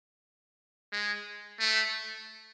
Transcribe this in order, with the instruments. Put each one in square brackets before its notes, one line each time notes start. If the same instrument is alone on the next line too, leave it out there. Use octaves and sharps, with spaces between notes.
[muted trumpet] G#3
A3